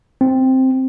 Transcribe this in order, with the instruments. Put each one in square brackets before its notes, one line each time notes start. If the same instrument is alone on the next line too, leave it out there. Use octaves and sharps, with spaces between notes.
[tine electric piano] C4